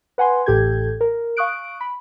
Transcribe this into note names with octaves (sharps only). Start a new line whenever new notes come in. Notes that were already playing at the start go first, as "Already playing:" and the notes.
B4 F#5 G#5 C6
A1 A2 G4 A4 G6 G#6
A#4
F5 C#6 D#6 F#6 D7
B5